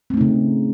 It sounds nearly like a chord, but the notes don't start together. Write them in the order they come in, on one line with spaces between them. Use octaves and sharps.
C4 A3 D#4 C#3